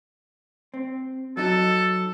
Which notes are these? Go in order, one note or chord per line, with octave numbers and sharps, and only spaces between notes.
C4
F#3 D#4 A4